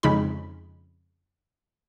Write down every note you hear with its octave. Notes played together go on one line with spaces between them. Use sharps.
F2 C#3 G#3 D#4 B5